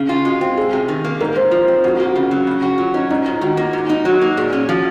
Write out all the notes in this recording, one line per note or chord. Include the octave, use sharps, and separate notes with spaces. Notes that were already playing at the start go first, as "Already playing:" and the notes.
Already playing: C#3
F4
G#3 F#4
C4 F#4
C3 G#4
C3
D#3
A#3
G#2 A#4
G#2 C5
F3 F4
C4
F2 F#4
F#4
A#3
F#4
C#3
F#3
C#3
F#4
F#3 F4
C#4 D#4
G#2 D#4
G#2 F4
D#3 F#4
A#3
G#2
D#4
F#3 F#4
A#3
A#2 G#4
C#4
F3 F#4